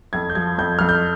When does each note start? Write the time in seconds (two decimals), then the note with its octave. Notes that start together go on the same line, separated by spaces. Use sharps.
0.13 F2 G#6
0.30 G6
0.35 F3 G#6
0.58 F2 G6
0.79 F2 F6
0.89 G6